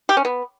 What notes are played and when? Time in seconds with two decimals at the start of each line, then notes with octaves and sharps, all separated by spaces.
0.09 G4
0.17 C#4
0.25 B3